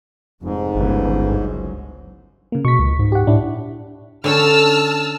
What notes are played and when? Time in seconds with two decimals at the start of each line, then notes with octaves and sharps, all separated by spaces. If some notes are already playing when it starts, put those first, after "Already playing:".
0.43 F1 G#2
0.75 G1 C#2 E3
1.29 F#2
2.52 C#3 A#3
2.65 B2 C#6 B6
2.79 C#2
2.99 G#2
3.12 G4 F#5
3.27 A2 D4 E4
4.24 D3 C#4 A4 A5 E6 F6